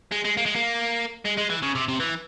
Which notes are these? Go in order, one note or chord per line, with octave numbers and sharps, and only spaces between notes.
G#3
G#3
A#3
G#3
A#3
G#3
G#3
E3
C#3
C3
C3
E3